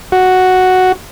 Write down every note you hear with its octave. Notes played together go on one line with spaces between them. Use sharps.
F#4